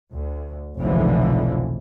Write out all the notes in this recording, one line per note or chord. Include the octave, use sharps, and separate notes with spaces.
D2
F1 B1 G#2 D3 E3 F3